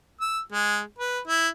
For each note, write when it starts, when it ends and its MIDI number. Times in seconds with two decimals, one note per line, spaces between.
0.21 0.40 88
0.52 0.81 56
0.99 1.19 71
1.27 1.48 64